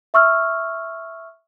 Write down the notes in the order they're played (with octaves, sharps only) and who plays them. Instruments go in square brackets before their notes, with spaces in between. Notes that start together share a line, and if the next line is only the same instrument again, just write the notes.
[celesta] E5 C#6 E6 F6